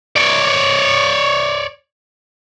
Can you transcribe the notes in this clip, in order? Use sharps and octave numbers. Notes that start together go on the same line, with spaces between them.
C#5 D5